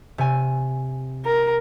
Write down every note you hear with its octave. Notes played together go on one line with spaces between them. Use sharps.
C3 G#5
A#4